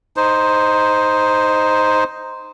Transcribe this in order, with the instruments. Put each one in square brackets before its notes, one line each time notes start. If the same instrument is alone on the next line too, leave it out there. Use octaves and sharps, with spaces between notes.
[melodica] D#4 C5